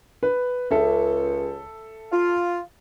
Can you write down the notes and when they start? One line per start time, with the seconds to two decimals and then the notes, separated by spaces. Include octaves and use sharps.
0.23 B4
0.71 C#2 A4 E5
2.11 F4